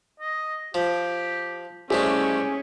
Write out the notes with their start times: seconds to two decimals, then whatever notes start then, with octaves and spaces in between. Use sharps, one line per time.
0.20 D#5
0.74 F3 G4
1.91 C2 G#3 A3 C#4 G4 G#4